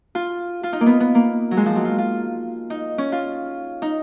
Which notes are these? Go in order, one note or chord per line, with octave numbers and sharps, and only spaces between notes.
F4
F4
D#4
A#3
B3
B3
A#3
F#3
G#3
F3
F#3
F4
F4
D#4
C#4
F4
D#4